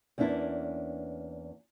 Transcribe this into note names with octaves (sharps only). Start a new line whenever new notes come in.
E2 A#3 C#4 D4 E4